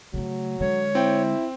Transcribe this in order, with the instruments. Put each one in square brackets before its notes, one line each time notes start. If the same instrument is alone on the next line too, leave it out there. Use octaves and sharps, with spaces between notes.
[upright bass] C#3 A3 [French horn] F#3
[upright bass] D3 G#3 [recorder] C#5
[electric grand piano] C4 G5 [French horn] E4